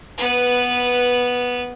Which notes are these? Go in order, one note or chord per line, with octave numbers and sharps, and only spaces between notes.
B3 B4